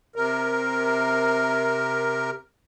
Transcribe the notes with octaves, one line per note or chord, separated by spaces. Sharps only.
C3 A#4